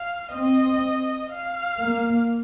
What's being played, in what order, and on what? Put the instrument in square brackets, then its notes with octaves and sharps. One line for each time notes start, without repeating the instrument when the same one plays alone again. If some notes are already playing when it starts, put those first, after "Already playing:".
Already playing: [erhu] F5
[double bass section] C4 [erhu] D#5
[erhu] F5
[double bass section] A#3